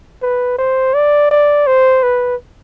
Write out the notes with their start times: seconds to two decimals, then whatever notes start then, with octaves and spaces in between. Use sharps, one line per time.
0.22 B4
0.58 C5
0.94 D5
1.31 D5
1.67 C5
2.03 B4